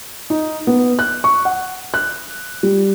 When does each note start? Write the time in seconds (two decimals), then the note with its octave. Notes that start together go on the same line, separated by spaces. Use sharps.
0.30 D#4
0.67 B3
0.99 F#6
1.24 C#6
1.45 F#5
1.94 F#6
2.63 G3